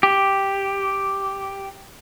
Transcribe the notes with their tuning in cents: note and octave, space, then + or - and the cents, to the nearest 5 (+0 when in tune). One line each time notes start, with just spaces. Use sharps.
G4 +0